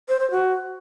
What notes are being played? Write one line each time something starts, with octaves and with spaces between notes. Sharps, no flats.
C5
C5
F#4